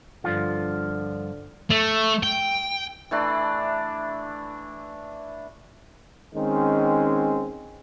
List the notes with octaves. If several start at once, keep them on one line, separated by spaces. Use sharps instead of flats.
G2 D3 F3 F4
A3
G5
E3 A3 D4 B5
D#3 G#3 C4 C#4